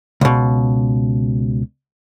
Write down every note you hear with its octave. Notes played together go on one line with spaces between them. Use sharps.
C#2 B2